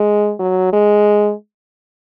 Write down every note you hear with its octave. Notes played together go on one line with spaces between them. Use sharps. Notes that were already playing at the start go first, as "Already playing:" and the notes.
Already playing: G#3
F#3
G#3